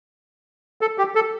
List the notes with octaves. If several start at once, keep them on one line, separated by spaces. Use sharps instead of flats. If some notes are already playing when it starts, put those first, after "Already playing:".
A4
G4
A4